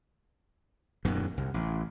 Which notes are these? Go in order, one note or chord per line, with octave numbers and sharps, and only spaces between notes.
D#1 F#2 B2 D#3
C2
A1